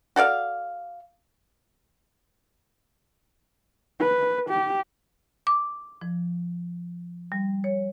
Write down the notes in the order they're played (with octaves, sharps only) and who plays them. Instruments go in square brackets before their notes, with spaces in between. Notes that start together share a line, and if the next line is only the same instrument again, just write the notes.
[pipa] F#4 A4 D5 F5
[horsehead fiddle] B4
G4
[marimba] D6
F3
G3
C#5